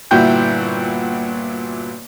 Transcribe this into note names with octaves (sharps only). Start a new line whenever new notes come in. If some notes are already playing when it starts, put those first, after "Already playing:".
G1 A#2 E4 F#4 G5 G6